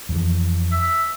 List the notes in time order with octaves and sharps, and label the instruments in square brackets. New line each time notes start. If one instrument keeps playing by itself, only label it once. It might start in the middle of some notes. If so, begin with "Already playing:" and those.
[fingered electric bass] F2 E3
[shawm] E5